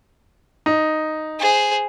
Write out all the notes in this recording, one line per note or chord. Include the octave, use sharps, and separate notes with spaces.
D#4
G#4 C5